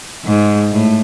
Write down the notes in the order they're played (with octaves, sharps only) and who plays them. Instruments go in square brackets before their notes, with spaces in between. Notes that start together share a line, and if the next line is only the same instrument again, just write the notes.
[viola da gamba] G#2
A2